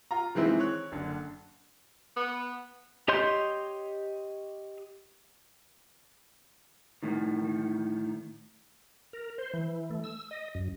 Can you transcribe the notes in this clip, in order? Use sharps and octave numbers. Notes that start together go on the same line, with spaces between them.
F4 A#5
D#3 E3 G#3 C4 E4
C#5 F#6
F#1 D3
B3
G4 C#5 D#5 C6 G6
A2 D#3
A#4
C5
E3
A3
E6
D#5
F#2